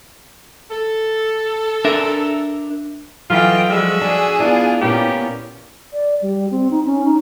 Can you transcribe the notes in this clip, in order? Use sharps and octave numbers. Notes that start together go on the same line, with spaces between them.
A4
D4 A#4 E5
E3 F#3 F4 A4 D#5 G5
F3 G3 G#3 F#4 E5
D4 G#4 G#5
B3 D4 E4 F4
A#2 A#3 B3 C#4 G4
D5
G3
C4
D#4
C#4
D#4